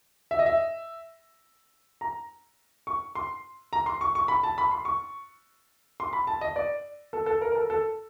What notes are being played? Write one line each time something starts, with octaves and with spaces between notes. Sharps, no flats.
E5
D#5
E5
A#5
C#6
C6
A#5
C6
C#6
C#6
B5
A5
B5
C6
C#6
C6
B5
A5
D#5
D5
A4
A4
A#4
A#4
A4
A4